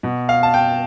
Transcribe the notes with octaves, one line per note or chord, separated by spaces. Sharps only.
B2
F5
A5
G5